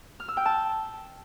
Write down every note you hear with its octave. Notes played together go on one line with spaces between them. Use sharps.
F6
E6
G5
A5